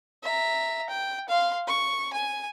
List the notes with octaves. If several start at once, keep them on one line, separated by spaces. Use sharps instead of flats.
E5 A#5
G5
F5 C6
C#6
G#5